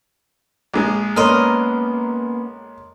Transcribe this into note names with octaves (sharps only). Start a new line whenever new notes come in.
A#1 G#3
A#3 B3 C#4 A#4 C#5 D#5 C6